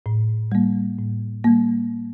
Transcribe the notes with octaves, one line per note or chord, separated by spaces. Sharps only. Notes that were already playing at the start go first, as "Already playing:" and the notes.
A2
G3 A#3
A2
G3 A#3